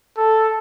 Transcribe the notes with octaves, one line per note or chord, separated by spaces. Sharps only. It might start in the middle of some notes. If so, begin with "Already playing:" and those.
A4